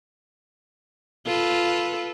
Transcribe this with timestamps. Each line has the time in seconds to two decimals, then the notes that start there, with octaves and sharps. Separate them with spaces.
1.26 F4 A4 B4